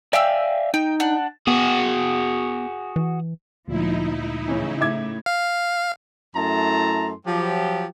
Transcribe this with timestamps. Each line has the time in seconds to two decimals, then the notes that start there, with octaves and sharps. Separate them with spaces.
0.13 D5 E5 F5 G5 G#5 E6
0.74 D#4 G5
1.00 D4 F#5
1.47 B3 F#4 G#4
2.96 E3
3.68 D2 A#2 F3 G#3 D#4 E4
4.48 A2 C#3 E3 C#4
4.81 A2 E5 D6 G#6
5.26 F5
6.35 F#2 A3 E4 A5 A#5 C6
7.26 F3 F#3 G4